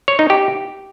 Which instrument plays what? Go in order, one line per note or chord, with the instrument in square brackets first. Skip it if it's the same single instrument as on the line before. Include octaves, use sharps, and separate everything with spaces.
[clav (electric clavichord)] C#5
D#4
G4